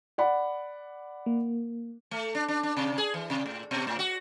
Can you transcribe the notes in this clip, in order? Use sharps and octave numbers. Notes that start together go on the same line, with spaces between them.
D5 F#5 B5
A#3
A3
D4
D4
D4
C3
G#4
E3
C3
A2
B2
A2
F#4